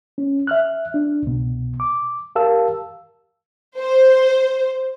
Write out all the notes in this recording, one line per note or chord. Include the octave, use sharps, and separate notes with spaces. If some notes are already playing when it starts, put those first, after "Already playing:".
C#4
E5 F6 F#6
D4
C2 B2
D6
G4 A#4 F5 A5 E6
C5